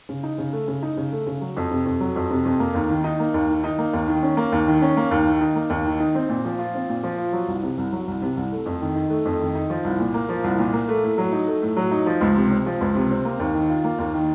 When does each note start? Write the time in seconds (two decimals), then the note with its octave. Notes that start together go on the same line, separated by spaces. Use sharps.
0.09 C#3
0.23 D#4
0.38 C#3
0.53 A3
0.68 C#3
0.83 D#4
0.97 C#3
1.12 A3
1.26 C#3
1.41 F#3
1.57 F2
1.71 C3
1.86 F2
2.00 F#3
2.16 F2
2.30 C3
2.45 F2
2.60 A#3
2.75 D#2
2.89 D#3
3.04 D#4
3.19 A#3
3.34 D#2
3.49 D#3
3.64 D#4
3.78 A#3
3.93 D#2
4.08 D#3
4.23 C#4
4.37 A#3
4.52 D#2
4.67 D#3
4.82 C#4
4.97 A#3
5.11 D#2
5.27 D#3
5.41 D#4
5.56 A#3
5.70 D#2
5.85 D#3
6.00 D#4
6.15 C4
6.29 A#2
6.45 F3
6.59 F4
6.74 C4
6.89 A#2
7.03 F3
7.18 F4
7.33 F#3
7.48 C2
7.62 C3
7.78 C2
7.92 F#3
8.07 C2
8.22 C3
8.37 C2
8.52 A3
8.66 F2
8.81 D#3
8.96 D#4
9.10 A3
9.25 F2
9.40 D#3
9.55 D#4
9.70 F3
9.84 C2
10.00 A#2
10.14 A#3
10.29 F3
10.44 C2
10.59 A#2
10.73 A#3
10.89 A3
11.03 A2
11.18 F#3
11.32 D#4
11.47 A3
11.62 A2
11.77 F#3
11.91 D#4
12.06 F3
12.21 C#2
12.36 C3
12.51 C4
12.66 F3
12.81 C#2
12.95 C3
13.10 C4
13.25 A#3
13.40 D#2
13.54 D#3
13.69 F4
13.84 A#3
13.99 D#2
14.14 D#3